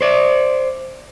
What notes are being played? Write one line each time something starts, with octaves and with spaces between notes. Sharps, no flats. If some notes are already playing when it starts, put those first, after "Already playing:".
C5 D5